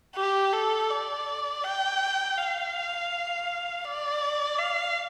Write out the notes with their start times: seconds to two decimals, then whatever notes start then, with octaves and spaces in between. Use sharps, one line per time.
0.16 G4
0.53 A4
0.90 D5
1.64 G5
2.37 F5
3.84 D5
4.59 F5